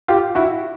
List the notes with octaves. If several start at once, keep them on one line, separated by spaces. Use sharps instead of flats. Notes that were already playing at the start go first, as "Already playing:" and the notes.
F4 G4
E4 F#4